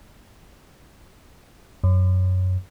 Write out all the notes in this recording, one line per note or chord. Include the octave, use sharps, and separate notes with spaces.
F#2